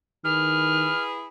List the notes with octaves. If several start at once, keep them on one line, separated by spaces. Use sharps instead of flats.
D#3 E4 G#4 B4 F6